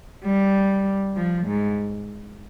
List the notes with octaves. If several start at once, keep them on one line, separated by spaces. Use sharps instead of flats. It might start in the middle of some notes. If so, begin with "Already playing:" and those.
G3
F3
G#2